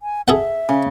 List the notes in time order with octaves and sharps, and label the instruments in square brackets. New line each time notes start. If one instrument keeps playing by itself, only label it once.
[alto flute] G#5
[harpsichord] G#4 A4 F#5 [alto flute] E5
[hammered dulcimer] C#3